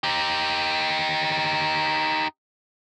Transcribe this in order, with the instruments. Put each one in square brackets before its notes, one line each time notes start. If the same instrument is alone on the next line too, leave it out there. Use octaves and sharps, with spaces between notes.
[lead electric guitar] D#4 G4